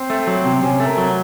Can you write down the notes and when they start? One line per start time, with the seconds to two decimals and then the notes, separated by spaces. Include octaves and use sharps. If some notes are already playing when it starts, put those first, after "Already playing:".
Already playing: C4
0.10 A3
0.27 F#3
0.45 C3
0.62 C3 C#4
0.80 A3
0.86 A#4
0.98 F#3